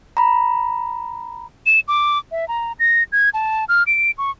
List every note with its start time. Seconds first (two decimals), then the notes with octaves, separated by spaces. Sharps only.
0.17 A#5 B5
1.66 E7
1.88 D6
2.32 E5
2.48 A#5
2.79 A#6
3.12 G#6
3.34 A5
3.69 F6
3.87 D7
4.18 C#6